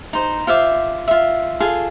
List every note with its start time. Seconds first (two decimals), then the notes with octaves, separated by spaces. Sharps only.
0.13 D#4 C5
0.47 F4 C5 E5 D6
1.08 F4 E5
1.60 F4 G#4 A4